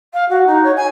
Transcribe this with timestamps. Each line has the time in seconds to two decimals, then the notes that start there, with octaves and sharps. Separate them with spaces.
0.13 F5
0.29 F#4
0.47 D#4
0.63 C#5
0.76 G#5